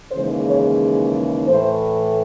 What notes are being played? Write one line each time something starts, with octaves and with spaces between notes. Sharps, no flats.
D#2 C#3 E3 G#3 C5
C#5
A2 E3 A3 C5